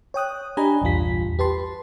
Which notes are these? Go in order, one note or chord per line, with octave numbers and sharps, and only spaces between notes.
C#5 G5 D#6 F#6
D4 G4 D#5 G#5 A#5 B5
A#1 E2 G2 F4 B6
G4 B4 A5 C6